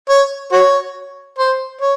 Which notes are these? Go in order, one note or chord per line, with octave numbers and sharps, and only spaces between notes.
C#5
F#4 C#5
C5
C#5